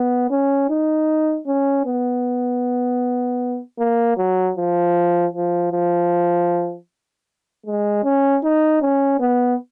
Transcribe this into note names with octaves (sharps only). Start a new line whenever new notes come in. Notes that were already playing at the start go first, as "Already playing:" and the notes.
Already playing: B3
C#4
D#4
C#4
B3
A#3
F#3
F3
F3
F3
G#3
C#4
D#4
C#4
B3